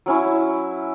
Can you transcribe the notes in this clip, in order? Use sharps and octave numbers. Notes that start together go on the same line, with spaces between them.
F#3 C#4 E4